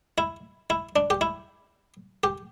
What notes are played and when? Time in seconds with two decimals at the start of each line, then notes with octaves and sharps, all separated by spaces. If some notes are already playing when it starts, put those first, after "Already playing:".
0.18 E4
0.70 E4
0.96 D4
1.10 G4
1.21 E4
2.24 G4